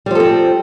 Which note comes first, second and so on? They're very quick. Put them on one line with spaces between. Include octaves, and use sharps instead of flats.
G3 F3 A4 C4